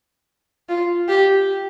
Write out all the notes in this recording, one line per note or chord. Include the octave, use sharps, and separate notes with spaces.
F4
G4